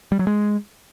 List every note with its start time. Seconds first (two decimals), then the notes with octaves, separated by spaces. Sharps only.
0.12 G3
0.19 F#3
0.27 G#3